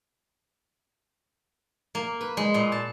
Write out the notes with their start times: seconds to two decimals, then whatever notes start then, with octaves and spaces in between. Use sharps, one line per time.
1.95 A#3
2.21 B4
2.37 G#3
2.54 A#2
2.72 A5